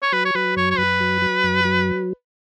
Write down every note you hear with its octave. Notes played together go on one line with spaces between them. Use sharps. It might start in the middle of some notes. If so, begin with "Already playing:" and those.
C#5
F#3 B4
C#5
F#3 B4
F#2 C#5
C#5
F#2 B4
F#3
F#3
F#2
F#3